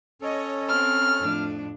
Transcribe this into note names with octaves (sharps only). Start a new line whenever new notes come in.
C#4 A4 C#5 D#5
C4 F6
F2 A2 D4